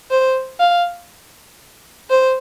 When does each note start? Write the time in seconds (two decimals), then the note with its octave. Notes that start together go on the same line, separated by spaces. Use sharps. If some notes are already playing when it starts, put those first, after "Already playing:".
0.10 C5
0.60 F5
2.10 C5